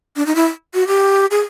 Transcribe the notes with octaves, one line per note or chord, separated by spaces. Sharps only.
D4
D#4
E4
F#4
G4
G#4